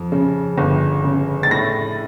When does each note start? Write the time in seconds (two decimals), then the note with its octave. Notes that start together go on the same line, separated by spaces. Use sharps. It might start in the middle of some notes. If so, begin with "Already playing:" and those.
Already playing: F2
0.12 C#3
0.58 G1
1.04 C#3
1.43 A6
1.51 A2 A#6